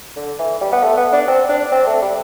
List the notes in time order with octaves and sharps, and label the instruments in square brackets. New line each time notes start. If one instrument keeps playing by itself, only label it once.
[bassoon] D3
E3
G3
B3
A3
B3
D4
C4
D4
C4
A3
G3